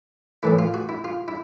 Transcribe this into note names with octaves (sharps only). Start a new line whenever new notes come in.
A2 E3 A3 E4
F4
F#4
E4
F4
E4